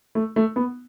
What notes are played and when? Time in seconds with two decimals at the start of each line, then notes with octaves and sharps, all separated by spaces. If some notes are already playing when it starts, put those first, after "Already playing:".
0.15 A3
0.36 A3
0.56 B3